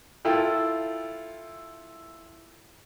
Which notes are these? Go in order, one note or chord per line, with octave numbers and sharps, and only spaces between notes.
E4 F4 A4 G5